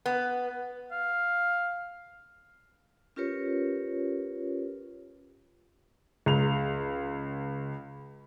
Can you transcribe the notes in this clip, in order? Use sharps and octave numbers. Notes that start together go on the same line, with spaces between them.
B3
F5
C#4 F4 G4 A#4 B4 C#5
C#2 F7